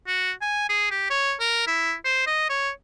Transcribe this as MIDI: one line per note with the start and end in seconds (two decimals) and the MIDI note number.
0.07 0.32 66
0.41 0.66 80
0.69 0.87 68
0.91 1.09 67
1.10 1.34 73
1.40 1.66 70
1.67 1.94 64
2.05 2.23 72
2.27 2.49 75
2.50 2.70 73